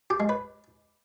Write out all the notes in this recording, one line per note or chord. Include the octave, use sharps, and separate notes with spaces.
G4
G#3
B4